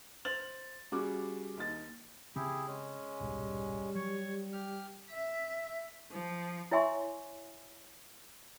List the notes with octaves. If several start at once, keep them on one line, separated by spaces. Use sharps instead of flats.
C5 A6 F7 F#7
C#3 G3 F#4 G#4 D6
D#2 D#4 A6
C#3 C4 E4 G4 G#4
G#3 C#4
D#1 B1 G#2 G3
F#3 C#5 C#6
G4 F6
E5
F3
E4 C#5 E5 G#5 C6 C#6